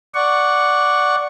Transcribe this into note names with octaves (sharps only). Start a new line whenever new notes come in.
D5 F#5 C#6